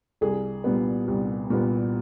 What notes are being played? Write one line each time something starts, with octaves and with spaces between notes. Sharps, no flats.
C2 G#4
A#2 G3 B3
C2
A#2 G3 B3